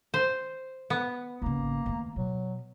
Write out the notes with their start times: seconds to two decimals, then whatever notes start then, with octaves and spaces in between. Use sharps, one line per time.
0.14 C5
0.90 B3
1.42 G#1 C#3 A#3
1.86 D#3 A3
2.16 B2 F#3